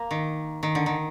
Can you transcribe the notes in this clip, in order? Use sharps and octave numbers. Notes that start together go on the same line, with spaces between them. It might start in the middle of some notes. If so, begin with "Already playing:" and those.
Already playing: A#3
D#3
D#3
D3
D#3